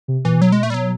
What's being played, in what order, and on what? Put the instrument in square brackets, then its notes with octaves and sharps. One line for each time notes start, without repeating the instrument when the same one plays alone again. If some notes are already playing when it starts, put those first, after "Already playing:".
[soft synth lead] C3
[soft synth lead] A#2 [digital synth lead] E3
[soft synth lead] B2
[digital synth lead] F#3
G#3
[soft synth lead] A#2 [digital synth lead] A3
[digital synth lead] G3
[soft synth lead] B2 [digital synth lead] F#3